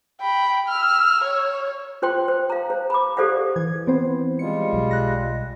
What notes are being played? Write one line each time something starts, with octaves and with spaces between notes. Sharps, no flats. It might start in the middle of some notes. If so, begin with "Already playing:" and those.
G5 B5
E6 F6
C#5
F4 C5 G5 C6
C5
F5 A#5
C5
B5 D6
G4 A4 C5 D5 F5 F#5
E3 G#6
E3 B3 C4 C5
G3 G#3 F4 C#7
B1
F#6 A#6